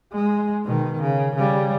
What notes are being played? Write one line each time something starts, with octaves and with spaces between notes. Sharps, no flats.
G#3
B2 D#3
C#3
C#3 G3